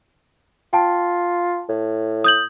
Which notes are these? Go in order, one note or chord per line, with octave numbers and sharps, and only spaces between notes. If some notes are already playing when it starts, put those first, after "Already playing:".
F4 G5 A5
A2
D#6 G6 F#7